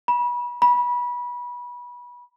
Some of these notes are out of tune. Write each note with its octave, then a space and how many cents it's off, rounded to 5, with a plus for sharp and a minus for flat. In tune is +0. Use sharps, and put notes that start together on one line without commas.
B5 -30
B5 -25